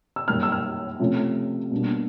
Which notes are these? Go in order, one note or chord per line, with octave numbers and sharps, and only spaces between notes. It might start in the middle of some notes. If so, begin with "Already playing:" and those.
E6
F#2 D#3 G3 A#3 F6
E6
F6
C3 F3 A3 C#4
B2 G3 A#3 D4